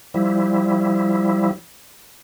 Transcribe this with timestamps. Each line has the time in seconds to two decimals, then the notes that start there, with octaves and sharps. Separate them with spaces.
0.14 F3 G3 E4